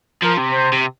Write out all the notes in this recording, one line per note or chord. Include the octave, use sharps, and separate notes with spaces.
F3 A#4
C3
C5
C3